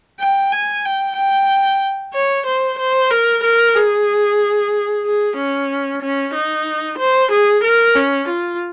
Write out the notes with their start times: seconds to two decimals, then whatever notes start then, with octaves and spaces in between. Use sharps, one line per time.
0.20 G5
0.52 G#5
0.85 G5
1.17 G5
2.14 C#5
2.46 C5
2.79 C5
3.11 A#4
3.44 A#4
3.76 G#4
5.05 G#4
5.37 C#4
6.02 C#4
6.35 D#4
6.98 C5
7.32 G#4
7.64 A#4
7.95 C#4
8.28 F4